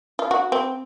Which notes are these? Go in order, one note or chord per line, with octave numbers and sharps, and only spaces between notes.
F4
F#4
C4